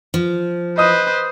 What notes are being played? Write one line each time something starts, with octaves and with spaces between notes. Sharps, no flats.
F3
B4 C5 D#5 D#6